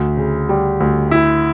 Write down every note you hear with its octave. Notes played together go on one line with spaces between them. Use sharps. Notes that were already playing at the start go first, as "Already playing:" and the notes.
Already playing: D2
C#3
G3
D2
E4